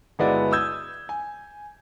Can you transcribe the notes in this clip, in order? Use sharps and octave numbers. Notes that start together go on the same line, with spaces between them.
G1 G#3 B3 E4 F#4 D5
D#6 E6 G6 G#6
G#5